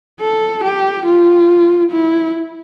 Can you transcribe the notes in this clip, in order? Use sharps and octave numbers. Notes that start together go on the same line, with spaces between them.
A4
G4
F4
E4